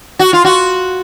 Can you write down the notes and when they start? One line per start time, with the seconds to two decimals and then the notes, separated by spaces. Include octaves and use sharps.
0.19 F#4
0.33 F4
0.45 F#4